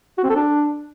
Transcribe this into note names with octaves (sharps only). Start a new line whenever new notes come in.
F#4
C4
A4
D4